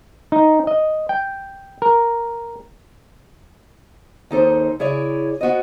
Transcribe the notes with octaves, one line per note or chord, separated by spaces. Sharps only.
D#4
D#5
G5
A#4
D#2 D#4 A4 C5
C#3 E4 G#4 C#5 D5
B3 F#4 C5 D#5